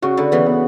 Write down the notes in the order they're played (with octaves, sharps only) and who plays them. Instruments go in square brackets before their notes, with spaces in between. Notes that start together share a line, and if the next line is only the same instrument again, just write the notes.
[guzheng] C#3 [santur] F#4
[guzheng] D3 [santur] B4
[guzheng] C#3 E3 [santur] B3
[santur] B3